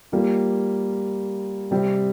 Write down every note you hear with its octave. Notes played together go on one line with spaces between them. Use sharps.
G3 A#3 F4
C3 G3 C4